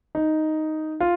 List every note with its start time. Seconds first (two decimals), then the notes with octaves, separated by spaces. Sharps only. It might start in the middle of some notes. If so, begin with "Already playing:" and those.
0.15 D#4
1.00 F4